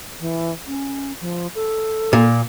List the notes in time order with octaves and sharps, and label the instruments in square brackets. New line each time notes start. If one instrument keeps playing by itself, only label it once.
[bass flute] E3
C#4
F3
A4
[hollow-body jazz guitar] A#2